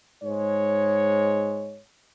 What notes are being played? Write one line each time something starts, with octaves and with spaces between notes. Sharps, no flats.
G#2 G#3 C#5